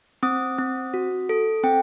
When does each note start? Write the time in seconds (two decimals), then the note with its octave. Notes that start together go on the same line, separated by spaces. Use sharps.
0.23 C4 D#6
0.58 C4
0.94 F#4
1.29 A4
1.63 C4 G5